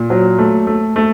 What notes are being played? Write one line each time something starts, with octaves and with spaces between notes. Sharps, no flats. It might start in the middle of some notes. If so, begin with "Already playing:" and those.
Already playing: A#2
F#3
A3
A3
A3